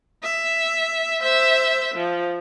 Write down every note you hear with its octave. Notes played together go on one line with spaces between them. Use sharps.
E5
C5 E5
F3